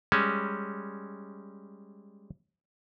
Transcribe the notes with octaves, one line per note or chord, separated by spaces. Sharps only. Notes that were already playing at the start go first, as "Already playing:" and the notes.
G3 G#3 C#4